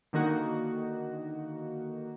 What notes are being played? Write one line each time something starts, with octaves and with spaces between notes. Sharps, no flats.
D3 D#3 A#3 D#4 F#4